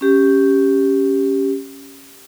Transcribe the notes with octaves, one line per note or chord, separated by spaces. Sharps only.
C#4 G4